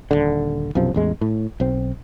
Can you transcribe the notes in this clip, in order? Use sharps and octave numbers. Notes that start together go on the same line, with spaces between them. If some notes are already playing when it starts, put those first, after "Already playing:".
D#1 B1 D3
B1 F#2 C3 F3
A1 E2 G#3
A2
B1 C4